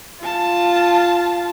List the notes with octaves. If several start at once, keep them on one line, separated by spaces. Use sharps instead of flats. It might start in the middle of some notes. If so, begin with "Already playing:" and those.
F4 A5